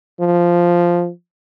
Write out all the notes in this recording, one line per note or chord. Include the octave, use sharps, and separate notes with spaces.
F3